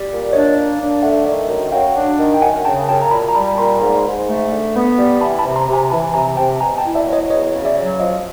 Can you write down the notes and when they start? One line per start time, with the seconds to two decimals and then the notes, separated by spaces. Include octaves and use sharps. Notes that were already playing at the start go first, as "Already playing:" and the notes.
Already playing: G3
0.10 A#2
0.33 D4 C#5 D#5
0.55 A#3
0.80 D4
1.03 A3 E5 F#5
1.25 D#3 D5 E5
1.48 F#2
1.72 F#3 F5 G5
1.96 D4
2.18 D#3
2.34 G5
2.42 F#2 F#5 G#5
2.65 C#3 G5 A5
2.88 F#2 G5 A5
3.02 A#5
3.11 A#2 A5 B5
3.28 A#5
3.35 G3 A5 B5
3.58 A#2 A#5 C6
3.81 G#2
4.05 G#2
4.27 A3
4.51 D3
4.74 B3
4.98 G3
5.21 E3 A5 B5
5.39 A5 B5
5.44 C3
5.56 A#5 C6
5.68 C3
5.73 G#5 A#5
5.90 E3 A5 B5
6.14 C3 G#5 A#5
6.37 C3 G5 A5
6.60 B2 G#5 A#5
6.78 G5 A5
6.84 E4
6.95 D5 E5
7.06 F#3
7.13 C#5 D#5
7.30 E2 C#5 D#5
7.54 C#3
7.65 D5 E5
7.77 F#3
8.00 F3 D#5 F5